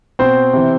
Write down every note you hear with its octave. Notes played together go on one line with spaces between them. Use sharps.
B2 C4 C5
C3 E3